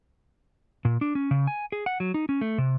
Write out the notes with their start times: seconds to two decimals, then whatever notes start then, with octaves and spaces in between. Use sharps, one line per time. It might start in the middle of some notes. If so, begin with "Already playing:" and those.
0.85 A#2
1.01 D4
1.15 C#4
1.31 C#3
1.47 G#5
1.72 G#4
1.86 F#5
2.00 F#3
2.14 D#4
2.29 C#4
2.41 A3
2.58 C3